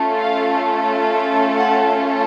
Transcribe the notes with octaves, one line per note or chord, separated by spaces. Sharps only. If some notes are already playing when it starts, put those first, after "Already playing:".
Already playing: A3 C#4 F4 A4
F5
F#5